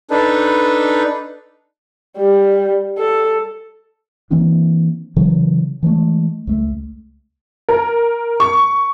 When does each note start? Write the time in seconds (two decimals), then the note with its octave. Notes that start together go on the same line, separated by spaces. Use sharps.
0.11 D4 D#4 A4 B4
2.17 G3
2.98 A4
4.30 E3 A#3 C4 D4
5.16 C#3 E3 F#3
5.83 E3 F#3 G#3 A3
6.47 C#2 A3
7.69 A#4
8.40 C#6